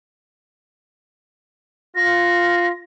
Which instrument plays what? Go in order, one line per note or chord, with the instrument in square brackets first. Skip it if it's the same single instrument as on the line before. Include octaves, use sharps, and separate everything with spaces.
[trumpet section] F4 [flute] A#6